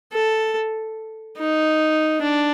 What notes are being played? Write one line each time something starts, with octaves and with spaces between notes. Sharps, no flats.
A4
D#4
D4